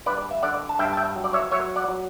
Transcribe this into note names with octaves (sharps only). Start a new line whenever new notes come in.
G2 B4 D5
E5
D3 D5 F#5
A5
G2 E5 G5
A5
E5 G5
F#3
D5
C#5 E5
F#3 C#5 E5
D5 F#5
F#3